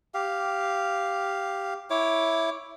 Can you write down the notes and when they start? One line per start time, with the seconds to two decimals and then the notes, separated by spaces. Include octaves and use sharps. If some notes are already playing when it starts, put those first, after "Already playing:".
0.14 G4 F5
1.90 E4 C#5 D6